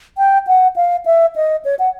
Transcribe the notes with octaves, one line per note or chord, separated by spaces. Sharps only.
G5
F#5
F5
E5
D#5
C#5
F#5